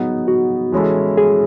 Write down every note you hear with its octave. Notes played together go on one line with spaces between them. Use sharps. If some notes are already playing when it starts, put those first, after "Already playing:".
Already playing: F#3 B3 D#4 G#4
F#4
E3 G#3 C#4 E4 A4
G#4